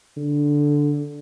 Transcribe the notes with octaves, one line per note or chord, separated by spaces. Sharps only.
D3